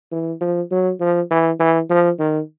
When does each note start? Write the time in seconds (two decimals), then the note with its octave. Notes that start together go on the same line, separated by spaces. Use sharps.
0.11 E3
0.41 F3
0.71 F#3
1.00 F3
1.30 E3
1.60 E3
1.90 F3
2.19 D#3